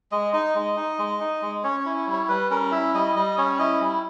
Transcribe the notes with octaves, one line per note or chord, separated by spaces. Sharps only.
G#3 D#5
D#4 D#5
G#3
D#4
G#3
D#4
G#3
C#4 C#5
C#5
E4
C#5
G3
C#5
G3 B4
C#4 A#4
E4 E5
G3 D#5
G3 D#5
C#4 C#5
E4 D#5
G3